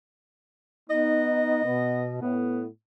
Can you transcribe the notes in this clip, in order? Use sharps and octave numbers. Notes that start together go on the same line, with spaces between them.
B3 D#4 D#5
B2 B3
A2 B3